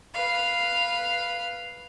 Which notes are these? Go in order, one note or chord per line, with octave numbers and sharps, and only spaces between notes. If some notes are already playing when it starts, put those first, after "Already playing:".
B4 F5